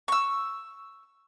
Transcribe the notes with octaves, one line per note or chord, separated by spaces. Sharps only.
C#6 E6